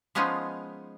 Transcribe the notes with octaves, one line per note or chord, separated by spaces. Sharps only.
F3 G#3 B3 C#4 D#4 F4